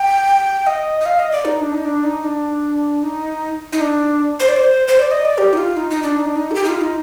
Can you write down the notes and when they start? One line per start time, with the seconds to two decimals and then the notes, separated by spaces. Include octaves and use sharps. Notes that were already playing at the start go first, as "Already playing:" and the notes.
Already playing: G5
0.67 D#5
1.01 D#5
1.06 F5
1.19 D#5
1.32 D5
1.45 D#4
1.61 D4
1.72 D#4
1.85 D4
2.04 D#4
2.24 D4
3.03 D#4
3.73 D#4
3.81 D4
4.40 C5
4.48 D5
4.56 C5
4.88 C5
4.99 D5
5.11 D#5
5.25 D5
5.38 G4
5.53 D#4
5.57 F4
5.77 D#4
5.90 D#4
6.03 D4
6.17 D#4
6.26 D4
6.36 D#4
6.51 A4
6.55 G4
6.64 D#4
6.69 F4
6.81 D#4